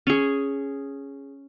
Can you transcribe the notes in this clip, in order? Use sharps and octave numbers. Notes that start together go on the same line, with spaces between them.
C#4 G#4